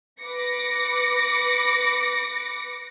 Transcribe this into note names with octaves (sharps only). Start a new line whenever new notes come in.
B4 D6 A#6 C#7